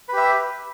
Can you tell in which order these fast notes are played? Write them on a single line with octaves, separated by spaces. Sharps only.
B4 G4 E5